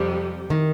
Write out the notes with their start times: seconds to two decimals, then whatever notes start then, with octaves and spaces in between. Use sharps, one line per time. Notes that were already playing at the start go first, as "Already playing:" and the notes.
Already playing: F2 C3 G3
0.50 D#3